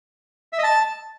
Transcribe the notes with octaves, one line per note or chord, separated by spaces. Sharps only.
E5
D#5
A5